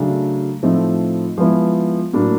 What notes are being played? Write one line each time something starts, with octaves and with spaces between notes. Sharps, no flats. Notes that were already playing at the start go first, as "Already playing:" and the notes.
Already playing: C#3 F#3 A3 D4
A2 F3 A3 C4 D#4
F3 G#3 B3 E4
A2 F#3 A#3 D4